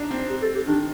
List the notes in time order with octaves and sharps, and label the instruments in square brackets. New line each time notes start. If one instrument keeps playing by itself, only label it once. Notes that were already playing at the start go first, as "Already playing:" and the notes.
Already playing: [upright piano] D4 D#4
C4
[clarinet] G4
A4
G4
[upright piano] D#3 [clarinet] D4